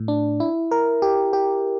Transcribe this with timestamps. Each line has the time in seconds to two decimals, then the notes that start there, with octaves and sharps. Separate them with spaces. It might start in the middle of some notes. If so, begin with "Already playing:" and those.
Already playing: A2
0.08 D4
0.40 E4
0.71 A#4
1.02 G4
1.33 G4